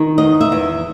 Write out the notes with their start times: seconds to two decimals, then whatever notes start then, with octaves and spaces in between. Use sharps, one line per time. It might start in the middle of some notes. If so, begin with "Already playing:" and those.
Already playing: D#3
0.18 E2 D#5
0.41 E5
0.52 E2